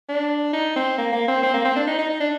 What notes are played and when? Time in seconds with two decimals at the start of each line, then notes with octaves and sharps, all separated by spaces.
0.09 D4
0.53 D#4
0.76 C4
0.98 A#3
1.12 A#3
1.28 C4
1.43 C4
1.53 A#3
1.65 C4
1.76 D4
1.87 D#4
1.98 D#4
2.10 D#4
2.20 D4